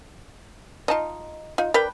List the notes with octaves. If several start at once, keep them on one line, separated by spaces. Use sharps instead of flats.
D#4 F4 D#5 A5
D#4 F4
D4 A#4 B4 G5